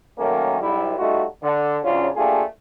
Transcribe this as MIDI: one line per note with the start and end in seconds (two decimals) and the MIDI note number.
0.18 0.60 51
0.18 0.60 54
0.18 0.60 57
0.18 0.60 58
0.18 0.60 61
0.61 0.95 35
0.61 0.95 55
0.61 0.95 64
0.98 1.25 55
0.98 1.25 57
0.98 1.25 63
0.98 1.25 65
0.98 1.25 66
1.42 1.79 50
1.84 2.08 44
1.84 2.08 49
1.84 2.08 54
1.84 2.08 61
1.84 2.08 62
1.84 2.08 65
2.16 2.43 57
2.16 2.43 58
2.16 2.43 62
2.16 2.43 65
2.16 2.43 67
2.16 2.43 68